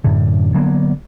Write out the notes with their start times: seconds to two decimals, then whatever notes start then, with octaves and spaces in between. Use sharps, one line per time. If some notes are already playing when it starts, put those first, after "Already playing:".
0.04 F#2 A2 D3
0.54 D3 F#3 A#3 B3